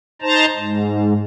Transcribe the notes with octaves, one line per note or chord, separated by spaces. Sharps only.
D#4 C5 A5 A#5
G#2